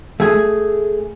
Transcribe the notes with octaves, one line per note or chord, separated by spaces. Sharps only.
A3 G#4